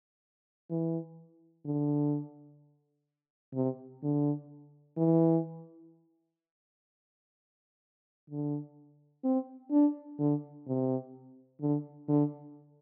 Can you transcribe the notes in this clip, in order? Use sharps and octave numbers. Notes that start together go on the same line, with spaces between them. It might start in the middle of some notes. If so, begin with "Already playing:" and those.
E3
D3
C3
D3
E3
D3
C4
D4
D3
C3
D3
D3